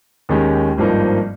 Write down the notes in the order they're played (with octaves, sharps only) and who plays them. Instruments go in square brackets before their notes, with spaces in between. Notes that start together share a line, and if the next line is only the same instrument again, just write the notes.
[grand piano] D#2 D#3 G#3 C#4 G4
G#1 G2 F3 A#3 D#4